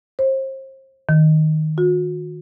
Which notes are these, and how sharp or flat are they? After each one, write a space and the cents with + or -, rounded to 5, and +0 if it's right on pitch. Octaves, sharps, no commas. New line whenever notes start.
C5 +35
D#3 +0
F#4 -40